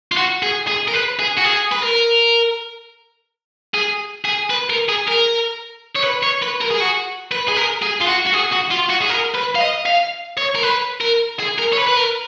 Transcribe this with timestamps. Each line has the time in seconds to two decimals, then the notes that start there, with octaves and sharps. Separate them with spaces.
0.12 F4
0.17 F#4
0.43 G#4
0.67 G#4
0.88 A#4
0.94 B4
1.19 G#4
1.37 F#4
1.44 G#4
1.72 B4
1.83 A#4
3.74 G#4
4.25 G#4
4.50 B4
4.70 A#4
4.89 G#4
5.08 A#4
5.96 C#5
6.04 B4
6.23 C#5
6.42 B4
6.61 A#4
6.71 G#4
6.80 F#4
7.32 B4
7.48 G#4
7.57 A#4
7.83 G#4
8.02 F4
8.08 F#4
8.27 F#4
8.33 G#4
8.53 F#4
8.71 F4
8.90 F#4
9.02 G#4
9.10 A#4
9.35 B4
9.56 F5
9.61 D#5
9.86 F5
10.38 C#5
10.55 A#4
10.63 B4
11.01 A#4
11.39 G#4
11.58 A#4
11.73 C#5
11.77 B4
11.88 B4
11.97 A#4